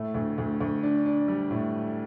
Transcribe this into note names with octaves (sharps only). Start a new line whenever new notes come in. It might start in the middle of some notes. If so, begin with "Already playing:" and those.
Already playing: A2 A3
D2
D2
D2
D4
D4
G3
A2